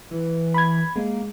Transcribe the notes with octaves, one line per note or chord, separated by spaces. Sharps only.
E3
B5 G#6
G#3 A#3